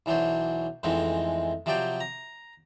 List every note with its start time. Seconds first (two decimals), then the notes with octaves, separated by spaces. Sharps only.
0.06 B1 E3 F#3 D4 C5
0.83 F2 G#2 E3 G#3 A3 C4
1.66 C3 F3 F#3 G4 D5 G5
2.00 A#5